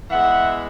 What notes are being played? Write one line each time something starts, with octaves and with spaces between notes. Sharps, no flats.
E3 G#3 B3 E5 F#5